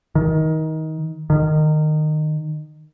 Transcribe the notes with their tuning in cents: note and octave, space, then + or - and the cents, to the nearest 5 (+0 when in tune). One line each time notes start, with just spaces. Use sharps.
D#3 +20
D#3 -20